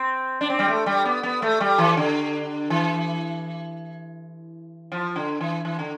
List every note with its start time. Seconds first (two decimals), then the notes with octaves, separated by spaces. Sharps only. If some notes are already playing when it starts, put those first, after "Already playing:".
Already playing: C4
0.41 D4
0.50 C4
0.59 G3
0.68 A3
0.86 G3
1.05 B3
1.23 B3
1.42 A3
1.60 G3
1.78 E3
1.97 D3
2.70 E3
4.92 F3
5.16 D3
5.41 E3
5.65 E3
5.79 D3